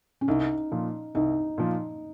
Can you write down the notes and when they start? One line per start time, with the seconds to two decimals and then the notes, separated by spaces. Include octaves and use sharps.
0.21 C#4
0.28 C2 D#4
0.72 A#2 F3
1.15 C2 D#4
1.58 A#2 F3